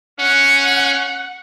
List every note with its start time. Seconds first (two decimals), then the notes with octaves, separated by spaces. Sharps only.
0.20 C#4 F#5